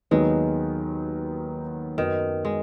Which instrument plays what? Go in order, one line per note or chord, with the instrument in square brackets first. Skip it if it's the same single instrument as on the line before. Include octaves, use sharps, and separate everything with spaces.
[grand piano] D#2 D#3 F#3 B3 D#4 [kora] G#3
[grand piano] F#2 F#3 B3 [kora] D#3
[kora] G#3